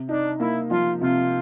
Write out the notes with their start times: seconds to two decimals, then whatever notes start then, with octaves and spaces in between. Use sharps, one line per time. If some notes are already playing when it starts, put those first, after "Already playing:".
Already playing: C3
0.09 D4 D#4
0.39 A#3 E4
0.71 F3 F4
1.01 C3 F4